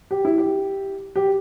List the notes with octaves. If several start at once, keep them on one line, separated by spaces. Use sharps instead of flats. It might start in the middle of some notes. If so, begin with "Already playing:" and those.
G4
E4
G4
G4